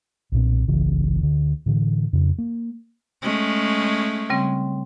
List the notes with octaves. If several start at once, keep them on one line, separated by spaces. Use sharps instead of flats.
B1 A#2 C4
G1 C2 C#3 E3
D2 D3
A2 D3 E3
F2 C#3
A#3
G#3 A3 C#4
C#3 G3 C4